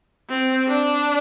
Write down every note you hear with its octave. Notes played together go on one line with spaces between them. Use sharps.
C4
D4